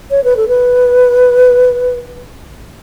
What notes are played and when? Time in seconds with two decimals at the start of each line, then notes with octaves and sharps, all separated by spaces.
0.11 C#5
0.24 B4
0.37 A4
0.48 B4